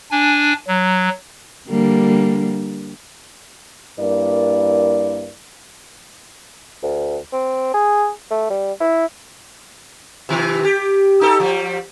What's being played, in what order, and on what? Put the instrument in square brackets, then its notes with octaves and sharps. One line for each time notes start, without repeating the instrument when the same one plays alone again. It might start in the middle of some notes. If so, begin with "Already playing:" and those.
[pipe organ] D4 G#5
F#3
[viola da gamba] D3 G3 A#3
[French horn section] G2 A#3 E4 A#4 D5
[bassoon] D2
C4
G#4
A3
G3
E4
[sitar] C3 D#3
G4
D#4 G4 A4
F3 G3